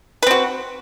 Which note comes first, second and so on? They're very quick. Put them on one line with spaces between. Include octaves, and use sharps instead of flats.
B4 C4 F#4